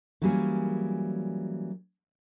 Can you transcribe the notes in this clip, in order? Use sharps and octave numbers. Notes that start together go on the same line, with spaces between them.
E3 F#3 G3 A#3 C#4 G#4